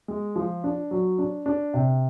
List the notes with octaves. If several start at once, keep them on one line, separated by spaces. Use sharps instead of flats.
G#3
F3
D4
F#3
D4
D4
C3